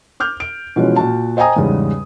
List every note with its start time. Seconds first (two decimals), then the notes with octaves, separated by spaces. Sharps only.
0.20 D6 F6 G6
0.40 D7
0.76 B2 E3 F3 G#3 C#4
0.96 A#2 F#4 A5
1.37 C5 D#5 G5 G#5 A#5 D#6
1.56 E2 G#2 C#3 G3